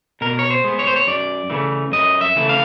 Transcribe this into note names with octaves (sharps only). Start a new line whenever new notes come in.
B2 A#4
C#5
C5
G#3 B3
C#5
C5
C#5
F#2 D5
C#3 E3 A3
F#2 D#5
E5
C#3 E3 A3
F5